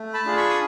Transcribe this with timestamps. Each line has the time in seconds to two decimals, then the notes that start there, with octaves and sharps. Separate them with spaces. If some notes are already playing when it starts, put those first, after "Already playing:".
Already playing: A3
0.14 A5 B5
0.25 D4 F4 G#4
0.36 B5 C#6
0.50 D#6